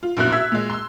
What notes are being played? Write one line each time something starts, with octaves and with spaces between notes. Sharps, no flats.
F4
A#1 F#2 B2 E4 F#6 F7
E5 E6 G#6
A#2 G#3
C6 E6